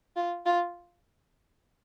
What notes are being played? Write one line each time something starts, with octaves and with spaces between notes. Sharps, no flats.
F4
F4